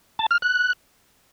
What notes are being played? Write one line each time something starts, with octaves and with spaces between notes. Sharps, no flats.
A5
F6
F#6